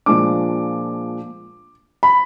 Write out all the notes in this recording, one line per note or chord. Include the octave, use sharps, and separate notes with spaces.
A#2 F3 G#3 D4 D6
B5